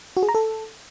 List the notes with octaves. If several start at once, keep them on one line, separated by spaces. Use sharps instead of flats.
F#4
G#4
A#5
A4